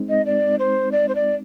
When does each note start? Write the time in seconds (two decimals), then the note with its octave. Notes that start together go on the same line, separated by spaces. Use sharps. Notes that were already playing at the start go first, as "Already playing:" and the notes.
Already playing: G#3 C4 D#4
0.09 D#5
0.26 D5
0.59 C5
0.92 D5
1.08 C5
1.15 D5